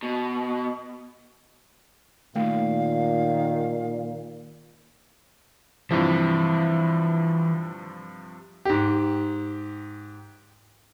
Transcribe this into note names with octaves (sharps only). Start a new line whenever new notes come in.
B2
A#2 D#3 A3 F5
G2 C3 E3 F3
G#2 G4